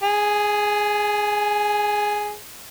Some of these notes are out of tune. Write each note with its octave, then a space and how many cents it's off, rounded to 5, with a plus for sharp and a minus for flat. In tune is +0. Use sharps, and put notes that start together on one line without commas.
G#4 +0 G#5 +40